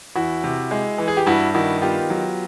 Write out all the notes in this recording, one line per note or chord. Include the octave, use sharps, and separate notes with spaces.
E2 E4 F#4
C3
G#3
E3
G#4
G4
G2 E4 F#4
D#3 E4 F#4
B3 F4 G4
F#3